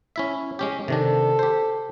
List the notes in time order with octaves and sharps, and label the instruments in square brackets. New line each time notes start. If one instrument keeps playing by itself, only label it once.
[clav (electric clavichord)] C#4 E4 E5
G#3 C#4 G4
[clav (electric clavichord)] C3 D#3 D4 [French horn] A4
[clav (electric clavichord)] G4 C5